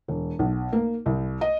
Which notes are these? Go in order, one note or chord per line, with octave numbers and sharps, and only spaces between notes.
E1
B1
A#3
C2
D#5